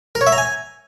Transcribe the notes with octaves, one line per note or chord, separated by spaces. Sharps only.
A#4
C#5
E5
A#5
G#5